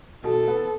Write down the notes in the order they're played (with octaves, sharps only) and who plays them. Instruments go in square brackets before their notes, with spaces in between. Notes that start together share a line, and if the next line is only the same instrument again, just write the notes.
[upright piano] B2 [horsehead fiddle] A4
[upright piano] B3